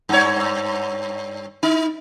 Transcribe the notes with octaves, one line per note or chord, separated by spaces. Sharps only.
G2 C#5
D#4